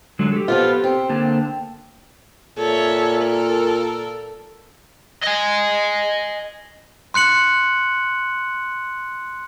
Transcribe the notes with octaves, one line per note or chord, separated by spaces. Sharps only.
D3 F#3 G#3
G4 A4
F3 B3 F4
C4
D3 A#3 A5
A#2 A4 C#5 E5
A4 A#4
D#5 G#5
C6 F#6 C#7 F#7